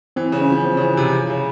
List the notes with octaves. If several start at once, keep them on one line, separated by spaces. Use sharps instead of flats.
E3 C4
C#3
C#4
F3
C4
C#3
E3
C3
C#3
C#3